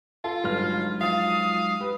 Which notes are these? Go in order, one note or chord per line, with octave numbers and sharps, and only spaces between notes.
F4 A4
G1 F#3 G#3 D#4 F6
F3 F5 D#6 A6
G4 B4